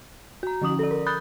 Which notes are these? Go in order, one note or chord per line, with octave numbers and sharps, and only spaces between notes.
F#4 A#5
D3 F3 C#4 D#6 F#7
A4 D5
A#4
B5 D#6 F#6 G6 A6 G7